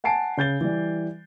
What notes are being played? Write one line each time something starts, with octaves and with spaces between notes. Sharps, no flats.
F#5 G#5 A5 C7 D7
C#3 G6 A6 G7
E3 G3